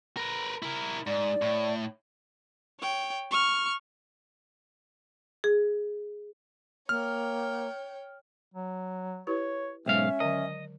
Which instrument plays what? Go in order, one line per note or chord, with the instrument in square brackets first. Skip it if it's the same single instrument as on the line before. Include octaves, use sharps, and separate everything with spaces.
[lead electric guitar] A#4 B4
E4 A#4
[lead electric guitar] G#2 [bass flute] D5
[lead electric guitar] A2
[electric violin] C#5 G5
C#6 F6
[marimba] G#4
[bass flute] A#3 [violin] C#5 G5 [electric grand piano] F6
[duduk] F#3
[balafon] E4 G4 B4 [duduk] C#5
[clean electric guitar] B1 G#2 F5 [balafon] G#3 [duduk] C#4 [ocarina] E5
[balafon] D3 D#3 F#3 [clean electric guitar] D#5